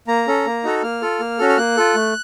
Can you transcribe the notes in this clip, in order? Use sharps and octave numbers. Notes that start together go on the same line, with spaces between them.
A#3 A#5
C#4 A4
A#3
D#4 F#4 A4
A#3 F6
F4 A4
A#3
C#4 F#4 A4
F6
A#3 F#6
F4 A4
A3